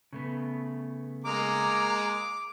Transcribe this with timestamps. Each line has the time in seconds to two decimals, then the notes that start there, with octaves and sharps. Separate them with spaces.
0.13 C#3 A3 B3
1.24 G#3 A#3 A#5 D6